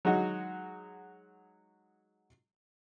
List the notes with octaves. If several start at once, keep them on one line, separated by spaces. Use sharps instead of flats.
F#3 G#3 D#4 F#4